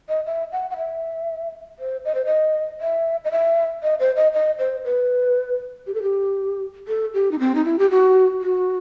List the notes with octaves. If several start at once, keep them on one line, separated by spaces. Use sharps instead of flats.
D#5
E5
F#5
F#5
E5
C5
D#5
C5
D#5
E5
D#5
E5
D#5
C5
D#5
D#5
C5
B4
G4
A4
G4
A4
G4
D#4
C4
D#4
E4
G4
F#4
F#4